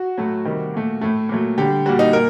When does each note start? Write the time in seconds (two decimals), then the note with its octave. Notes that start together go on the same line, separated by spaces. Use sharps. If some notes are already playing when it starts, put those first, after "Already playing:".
Already playing: F#4
0.17 A2 F#3 A3
0.45 C3 D#3 G3
0.74 A#2 A3
1.01 A2 A3
1.29 A#2 F#3 A3
1.58 D3 G3 G4
1.86 A#2 G3 F#4
1.99 D#4
2.13 A#2 A#4